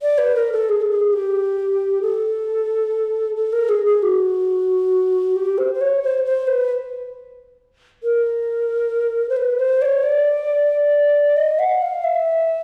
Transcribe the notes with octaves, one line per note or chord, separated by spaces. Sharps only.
D5
B4
A#4
A4
G#4
A4
G#4
G4
A4
A4
A#4
G#4
G#4
F#4
G4
C5
C5
C#5
C5
C5
B4
A#4
C5
B4
C5
D5
C#5
D5
D#5
F#5
F5
E5